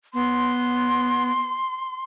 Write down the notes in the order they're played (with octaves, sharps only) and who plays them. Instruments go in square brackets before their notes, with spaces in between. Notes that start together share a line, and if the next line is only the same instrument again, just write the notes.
[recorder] B3 [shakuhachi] C6